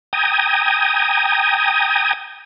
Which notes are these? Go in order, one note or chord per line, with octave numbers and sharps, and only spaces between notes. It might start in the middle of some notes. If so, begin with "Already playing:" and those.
G5 G#5 A#5 D#6